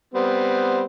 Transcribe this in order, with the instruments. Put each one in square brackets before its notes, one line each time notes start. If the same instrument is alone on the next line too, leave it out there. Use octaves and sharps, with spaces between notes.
[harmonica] G3 B3 C4